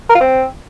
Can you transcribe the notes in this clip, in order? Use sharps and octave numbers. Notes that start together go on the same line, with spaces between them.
A#4
F4
C4